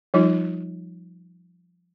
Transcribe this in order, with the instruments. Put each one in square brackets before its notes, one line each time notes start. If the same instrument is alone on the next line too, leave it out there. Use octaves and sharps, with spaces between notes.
[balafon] F3 G3 D#4 F4